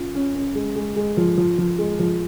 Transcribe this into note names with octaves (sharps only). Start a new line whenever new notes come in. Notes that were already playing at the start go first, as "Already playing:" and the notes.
Already playing: C#4 F4
C#4
C#4
G#3
G#3
G#3
F3
F3
F3
G#3
F3